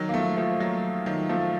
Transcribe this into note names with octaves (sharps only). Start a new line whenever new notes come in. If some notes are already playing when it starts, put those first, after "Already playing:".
Already playing: D#3 F#3
A#3
F3 A3
F3 A3
F#3 A#3
D#3 F#3
F3 A3